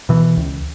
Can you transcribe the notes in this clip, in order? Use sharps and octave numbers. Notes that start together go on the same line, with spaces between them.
B2 E3
C#2